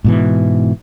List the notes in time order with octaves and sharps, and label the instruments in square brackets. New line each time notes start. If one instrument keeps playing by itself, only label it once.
[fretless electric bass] G#2 B2 E3